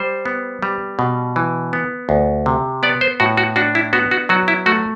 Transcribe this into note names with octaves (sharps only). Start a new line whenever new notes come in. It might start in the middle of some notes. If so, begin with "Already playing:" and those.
Already playing: G3 C5
B3
G3
B2
E3
B3
D2
C3
B3 D5
C5
A2 F#4
F#4
D4 F#4
E4
B3 F#4
F#4
F#3 F#4
E4
A3 F#4